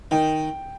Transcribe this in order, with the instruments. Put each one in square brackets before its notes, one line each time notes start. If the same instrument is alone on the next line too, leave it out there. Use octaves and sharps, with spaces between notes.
[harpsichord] D#3 [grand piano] G5